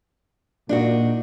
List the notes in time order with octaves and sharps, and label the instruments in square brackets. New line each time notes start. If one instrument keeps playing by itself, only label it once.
[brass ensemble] A#2 [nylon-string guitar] D4 D#4 F#4